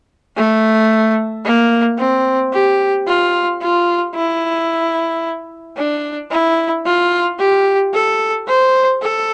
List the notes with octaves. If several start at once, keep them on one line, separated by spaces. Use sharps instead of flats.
A3
A#3
C4
G4
F4
F4
E4
D4
E4
F4
G4
A4
C5
A4